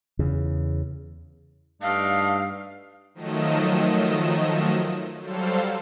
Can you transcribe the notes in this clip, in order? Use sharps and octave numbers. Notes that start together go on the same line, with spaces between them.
E2 C#3
G2 A3 D4 D#4 F5
D#3 F3 F#3 A3 D#5 E7
F#3 G3 A4 C5 F5